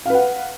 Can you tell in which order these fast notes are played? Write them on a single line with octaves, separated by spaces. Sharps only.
F5 B4 F#5